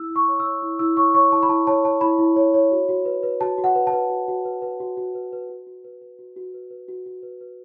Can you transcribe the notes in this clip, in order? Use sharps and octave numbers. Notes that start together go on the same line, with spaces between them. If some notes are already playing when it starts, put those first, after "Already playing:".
Already playing: E4 E6
E4
C#6
C#5
E6
C#5
E4
E4 E6
C#5 C#6
C#5 C#6
E4 A5
B5
E4 A5
C#5 A5
C#5 A5
E4 B5
E4
C#5
C#5
F#4
F#4
B4
B4
F#4 A5
F#4
F#5
B4
A5
B4
F#4
F#4
B4
B4
F#4
F#4
B4
B4
F#4
F#4
B4
B4
F#4
F#4
B4
B4
F#4
F#4
B4
B4